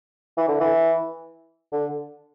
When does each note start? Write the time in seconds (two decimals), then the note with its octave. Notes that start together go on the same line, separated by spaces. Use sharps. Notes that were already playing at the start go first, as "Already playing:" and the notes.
0.38 E3
0.48 D3
0.60 E3
1.72 D3